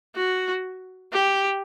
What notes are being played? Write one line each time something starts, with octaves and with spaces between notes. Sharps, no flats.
F#4
G4